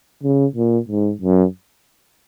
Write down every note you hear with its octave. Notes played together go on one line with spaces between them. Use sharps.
C#3
A#2
G#2
F#2